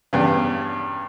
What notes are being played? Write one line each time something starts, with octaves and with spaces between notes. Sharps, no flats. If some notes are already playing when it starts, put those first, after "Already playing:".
E2 G2 C#3